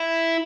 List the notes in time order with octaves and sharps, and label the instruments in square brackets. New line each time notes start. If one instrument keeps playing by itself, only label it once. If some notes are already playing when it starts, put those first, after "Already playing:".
Already playing: [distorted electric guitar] E4